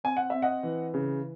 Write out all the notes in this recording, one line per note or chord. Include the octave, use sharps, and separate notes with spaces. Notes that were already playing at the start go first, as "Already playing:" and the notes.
C4 G#5
F#5
C4 E5
D#5 F#5
E3
C#3